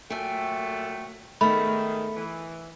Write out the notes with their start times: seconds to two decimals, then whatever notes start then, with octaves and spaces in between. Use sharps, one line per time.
0.10 A#2 F#3 A3 G5 G#5
1.41 G#2 D#3 A3 B3 B5
2.16 E3